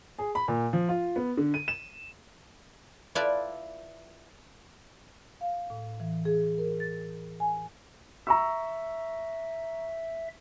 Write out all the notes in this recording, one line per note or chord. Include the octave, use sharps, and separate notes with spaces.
G#4
B5
A#2
F3
F4
B3
D3
D#7
E7
E4 F4 B4 D5 A5
F5
A2
E3
G#4
A#4
A6
G#5
E5 A#5 C#6 E6